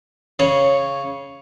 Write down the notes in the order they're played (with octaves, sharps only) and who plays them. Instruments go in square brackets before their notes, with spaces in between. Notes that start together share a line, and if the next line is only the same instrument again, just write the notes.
[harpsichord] C#3 [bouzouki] C#5